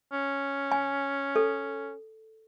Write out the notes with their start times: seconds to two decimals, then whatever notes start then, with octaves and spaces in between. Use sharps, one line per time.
0.13 C#4
0.72 G#5
1.36 A4